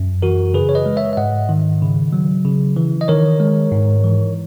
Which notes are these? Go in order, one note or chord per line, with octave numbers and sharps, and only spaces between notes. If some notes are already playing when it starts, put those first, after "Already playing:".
Already playing: F#2
E3 F#4 A#4
C#3 G#4 B4
C#5
B4 D#5
G#3
C#5 E5
E5
G#2 D#5 F#5
D#3
C#3
F#3
C#3
E3
D#5
D#3 A#4 C#5
G#3
G#2
E3